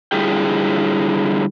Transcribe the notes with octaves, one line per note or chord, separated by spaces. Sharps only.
D3 G3 E4 F4 G#4 G5